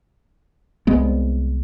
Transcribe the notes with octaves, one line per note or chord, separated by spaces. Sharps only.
C2 G#3 B3